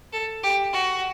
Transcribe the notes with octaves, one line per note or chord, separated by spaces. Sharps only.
A4
G4
F#4